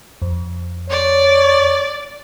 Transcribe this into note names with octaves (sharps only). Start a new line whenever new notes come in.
F2
C#5 D5